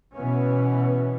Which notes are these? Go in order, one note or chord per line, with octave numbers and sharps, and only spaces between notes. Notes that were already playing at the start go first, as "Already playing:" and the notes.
B2 E3 B3 C#4